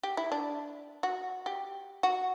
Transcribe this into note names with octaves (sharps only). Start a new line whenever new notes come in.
G4
E4
D4
F#4
G4
F#4